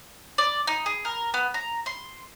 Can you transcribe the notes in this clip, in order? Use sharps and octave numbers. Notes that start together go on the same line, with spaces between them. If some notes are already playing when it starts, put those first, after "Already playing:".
D5
D#4
G#4
A#4
B3
A#5
C6